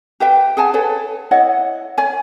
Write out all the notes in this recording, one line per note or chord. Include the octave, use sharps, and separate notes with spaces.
G4 B4 E5 G5
G#4 F#5 G#5 A5
A4 B4 C#5
E4 C#5 D#5 F#5
C#5 G#5